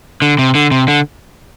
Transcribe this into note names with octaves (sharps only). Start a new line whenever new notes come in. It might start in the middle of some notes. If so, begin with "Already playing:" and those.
D3
C3
D3
C3
D3